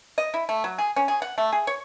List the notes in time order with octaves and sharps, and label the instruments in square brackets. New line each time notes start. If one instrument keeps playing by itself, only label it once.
[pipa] D#5
E4
A3
F#3
G#4
C#4
G#4
F#5
A3
G#4
C#5